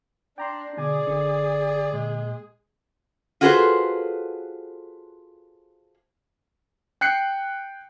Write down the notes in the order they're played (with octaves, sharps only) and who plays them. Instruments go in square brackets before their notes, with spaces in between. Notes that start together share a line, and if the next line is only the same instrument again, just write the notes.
[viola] D4 [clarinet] D5 [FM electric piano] G5 A#5 C6
[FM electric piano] B2 G#5 [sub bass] D3 [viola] G#4 [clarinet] D5
[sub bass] F#1 [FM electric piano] D3
[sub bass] A#2 [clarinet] G#3
[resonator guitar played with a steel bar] F4 F#4 G#4 A4 B4 C5
[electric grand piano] G5 F#6 C7 C#7